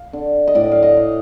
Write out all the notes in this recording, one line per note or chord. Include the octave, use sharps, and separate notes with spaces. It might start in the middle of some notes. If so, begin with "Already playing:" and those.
Already playing: F5
D3
D#5
A2 D5
F5
D#5
A2